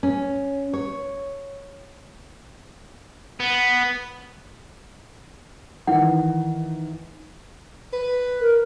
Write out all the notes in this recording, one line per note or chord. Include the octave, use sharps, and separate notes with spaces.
C#4
C#5
B3
D#3 E3 F#5
B4
A#4